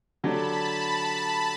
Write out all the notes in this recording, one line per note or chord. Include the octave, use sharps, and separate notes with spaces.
D3 F#3 A3 D4 G4 A5 B5